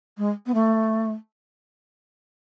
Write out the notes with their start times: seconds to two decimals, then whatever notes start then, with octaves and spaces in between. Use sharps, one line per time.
0.18 G#3
0.46 B3
0.54 A3